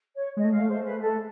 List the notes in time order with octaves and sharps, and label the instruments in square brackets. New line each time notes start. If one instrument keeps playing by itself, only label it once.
[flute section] C#5
[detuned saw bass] G#3 [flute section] D#5
[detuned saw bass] A3
[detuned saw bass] G#3 [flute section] F5
[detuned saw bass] A3
[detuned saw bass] G#3 [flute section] C5
[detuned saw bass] A3
[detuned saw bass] G#3 [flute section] B4
[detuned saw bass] A3
[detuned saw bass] G#3 [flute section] A4
[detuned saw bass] A3